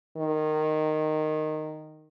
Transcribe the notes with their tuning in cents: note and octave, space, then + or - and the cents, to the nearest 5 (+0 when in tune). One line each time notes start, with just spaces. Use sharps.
D#3 -10